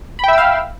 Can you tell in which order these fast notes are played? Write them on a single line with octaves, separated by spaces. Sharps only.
B5 G5 E5 E6 F5